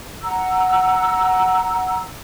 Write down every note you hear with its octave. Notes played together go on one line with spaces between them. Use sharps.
F#5 A#5 E6